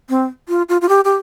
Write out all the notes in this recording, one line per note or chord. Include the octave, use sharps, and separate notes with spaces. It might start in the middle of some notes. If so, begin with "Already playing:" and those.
C4
F4
F4
F4
G4
G4